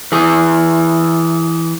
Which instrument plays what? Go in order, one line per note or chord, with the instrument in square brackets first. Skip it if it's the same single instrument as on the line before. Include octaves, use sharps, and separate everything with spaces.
[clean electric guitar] E3 G#4